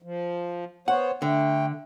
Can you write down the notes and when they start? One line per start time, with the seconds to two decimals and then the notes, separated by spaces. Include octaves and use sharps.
0.02 F3
0.88 B3 C5 C#5 F#5
1.22 D3 A3 G5